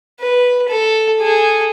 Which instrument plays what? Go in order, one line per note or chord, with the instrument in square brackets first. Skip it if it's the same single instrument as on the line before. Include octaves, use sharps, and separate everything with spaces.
[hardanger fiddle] B4
A4
G#4 A4